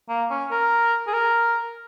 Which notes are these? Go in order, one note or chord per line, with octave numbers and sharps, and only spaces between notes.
A#3
C#4
A#4
G#4
A#4